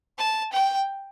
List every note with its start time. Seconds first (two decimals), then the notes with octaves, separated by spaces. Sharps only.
0.18 A5
0.52 G5